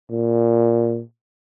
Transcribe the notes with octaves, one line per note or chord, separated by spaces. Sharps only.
A#2